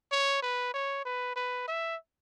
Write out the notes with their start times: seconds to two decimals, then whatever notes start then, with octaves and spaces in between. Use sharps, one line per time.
0.12 C#5
0.43 B4
0.74 C#5
1.05 B4
1.36 B4
1.68 E5